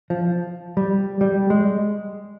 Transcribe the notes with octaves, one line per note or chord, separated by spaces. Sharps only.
F3
G3
G3
G#3